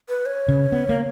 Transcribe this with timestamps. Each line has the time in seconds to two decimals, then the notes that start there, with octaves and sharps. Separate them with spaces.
0.09 B4
0.26 C#5
0.48 C#3
0.72 B3
0.89 A#3